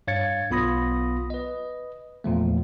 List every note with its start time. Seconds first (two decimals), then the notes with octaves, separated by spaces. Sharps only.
0.07 G2 C#5 F5 G#6 A6 C#7
0.50 B1 B3 F4 B5 D#6 A#6
1.30 B4 D#5
2.24 E2 A#2 F3 A3